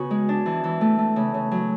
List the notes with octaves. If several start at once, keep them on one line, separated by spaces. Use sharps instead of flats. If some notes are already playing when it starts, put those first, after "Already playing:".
Already playing: C#3 B3 F#4
G#3
D4
E3
E3
A3
A3
C#3
C#3
F#3